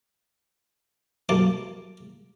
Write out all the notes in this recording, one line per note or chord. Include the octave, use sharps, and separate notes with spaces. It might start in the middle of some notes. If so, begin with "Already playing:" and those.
B1 A#3 A5 D6